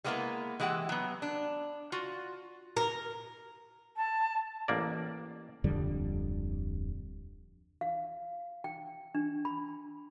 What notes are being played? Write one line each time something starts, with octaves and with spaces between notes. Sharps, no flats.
G3 G#3 A#3 B3 E4 B4
E3 G#3 E4 G4 F#5
F#3 B3
D4
F4 F#4
A#4
A5
A1 A#3 D5
D1 F2 D3 G3
F5
G5
D4
B5